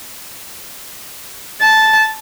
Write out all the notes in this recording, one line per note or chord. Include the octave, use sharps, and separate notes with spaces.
A5